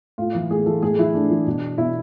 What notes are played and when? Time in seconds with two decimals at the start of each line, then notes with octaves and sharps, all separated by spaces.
0.18 A2 F4
0.35 E3
0.50 A2 G#4
0.66 E3 A4
0.82 A2 G#4
0.99 E3 E4
1.14 A2 D4
1.30 E3
1.47 B2
1.78 B2 E4